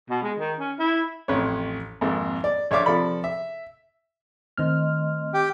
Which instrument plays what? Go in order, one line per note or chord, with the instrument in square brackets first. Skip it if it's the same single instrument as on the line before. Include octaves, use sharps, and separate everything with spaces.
[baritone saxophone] B2
G#3
D#3
C#4
E4
[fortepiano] A1 F2 C#5
G#1 F2 G#2 A#3
D5
A#1 C#5 D5 E5 F5 D6
C3 F3 A4 D5 B5
E5
[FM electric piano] D#3 C4 F6 [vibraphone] A3 D#5 C6
[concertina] G4 G5